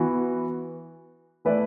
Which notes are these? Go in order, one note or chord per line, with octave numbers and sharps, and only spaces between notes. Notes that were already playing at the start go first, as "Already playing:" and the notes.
Already playing: E3 B3 F#4
E3 A3 E4 B4 D5